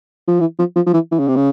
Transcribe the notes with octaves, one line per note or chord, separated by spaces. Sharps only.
F3
E3
F3
F3
F3
E3
E3
C#3
C3
C#3